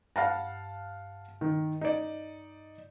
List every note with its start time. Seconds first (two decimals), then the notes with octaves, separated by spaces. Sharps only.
0.16 G2 F5 F#5 A5
1.41 D#3
1.81 D#4 D5